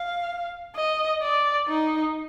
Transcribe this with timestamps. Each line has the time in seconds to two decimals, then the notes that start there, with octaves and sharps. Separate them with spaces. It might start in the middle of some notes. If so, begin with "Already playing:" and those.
Already playing: F5
0.76 D#5
1.22 D5
1.68 D#4